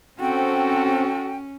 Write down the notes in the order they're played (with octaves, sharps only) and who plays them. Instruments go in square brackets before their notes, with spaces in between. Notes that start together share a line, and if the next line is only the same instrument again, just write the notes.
[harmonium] C4 [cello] C#4 [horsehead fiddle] F#4 A4 [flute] G5